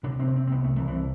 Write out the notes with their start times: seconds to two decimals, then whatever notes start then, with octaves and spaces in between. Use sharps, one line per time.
0.03 C3 D4
0.20 C4
0.27 C3
0.36 C4
0.47 C4
0.51 C2 B3
0.64 A3
0.76 C2 E3
0.88 E3